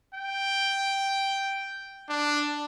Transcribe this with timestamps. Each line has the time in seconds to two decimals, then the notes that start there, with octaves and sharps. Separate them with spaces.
0.15 G5
2.09 D4